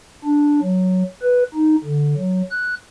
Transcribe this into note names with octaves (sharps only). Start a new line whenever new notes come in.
D4
F#3
B4
D#4
D3
F#3
F#6